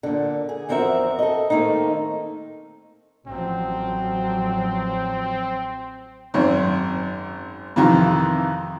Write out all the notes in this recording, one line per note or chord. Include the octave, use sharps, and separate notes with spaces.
A#2 D3
G#4
E2 F3 C4 F#4 A#4 E5
A4 D#5
D#3 A3 A#3 C4 D#4
A1 F3 F#3 C4
G#1 F#2 C4
F2 C3 D#3 E3